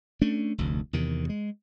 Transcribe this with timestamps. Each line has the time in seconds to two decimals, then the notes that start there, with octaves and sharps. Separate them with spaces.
0.22 A3 C#4 D4
0.58 F1 D2
0.93 E2 C3 D#3
1.29 G#3